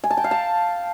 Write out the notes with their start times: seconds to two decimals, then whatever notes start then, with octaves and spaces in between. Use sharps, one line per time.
0.04 G#5
0.10 A5
0.17 G5
0.24 F5
0.31 A5